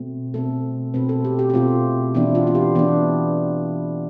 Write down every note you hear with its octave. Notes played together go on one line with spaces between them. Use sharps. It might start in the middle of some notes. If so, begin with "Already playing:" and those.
Already playing: B2 A3 C4
B2 A3 C4 A4
B2 A3 C4 B4
A4
G4
G4
G4
B2 A3 C4 F4
E3 B3 D4 E4
F4
F4
G4
E3 B3 D4